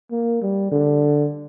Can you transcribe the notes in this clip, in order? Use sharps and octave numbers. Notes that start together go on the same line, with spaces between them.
A#3
G3
D3